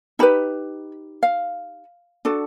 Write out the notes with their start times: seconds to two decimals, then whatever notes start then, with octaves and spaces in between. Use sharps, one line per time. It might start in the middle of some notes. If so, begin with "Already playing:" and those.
0.19 D#4 G4 B4 B5
1.23 F5
2.25 D4 F#4 A4